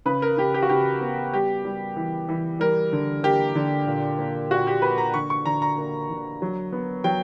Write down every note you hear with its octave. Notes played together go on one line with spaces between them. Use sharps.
C#3 B4
A#4
C#3 G4
G4
F#4
C#3 G4
B3
G3 G4
G3
E3
E3
G3 A#4
D3
A#3 G4
D3
A#2
A#3
A#2 F#4
G4
A#3 B4
A#5
D3 C#6
C#6
D3 A#5
A#5
A#3
D3
F#3
B3
F#3 G5